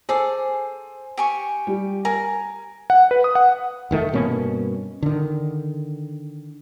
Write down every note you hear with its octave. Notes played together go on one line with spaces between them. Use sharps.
G#4 A4 C5 D6
G4 G#5 C#6
G3
A#4 G#5
F#5
B4
D#6
F#5
F1 D#3 A3
G2 B2 A#3 C#4
D3 D#3